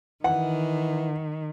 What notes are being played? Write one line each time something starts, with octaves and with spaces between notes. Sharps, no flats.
D#3 E3 F#5